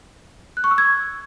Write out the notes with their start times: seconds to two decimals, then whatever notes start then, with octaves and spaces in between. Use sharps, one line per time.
0.57 F#6
0.64 C#6
0.71 E6
0.78 G#6